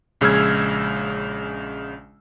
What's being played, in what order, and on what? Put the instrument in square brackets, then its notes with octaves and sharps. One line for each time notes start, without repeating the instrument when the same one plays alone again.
[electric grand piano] A#1 C#3 G#3 E6 F6 G#6